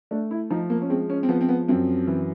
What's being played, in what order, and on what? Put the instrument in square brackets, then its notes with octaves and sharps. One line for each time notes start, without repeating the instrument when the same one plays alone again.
[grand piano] A3 D4
E4
F3 D#4
A#3
C#4
G#3 C4
C#4
C4
F3 B3
C4
B3
F#2 C4
E3